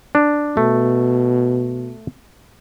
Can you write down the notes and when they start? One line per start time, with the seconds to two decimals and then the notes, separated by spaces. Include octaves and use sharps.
0.15 D4
0.57 B2 A3